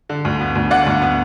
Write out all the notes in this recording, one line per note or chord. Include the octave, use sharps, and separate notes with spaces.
D3
D2
B3
D2
D3 D5 F#5
D2
B3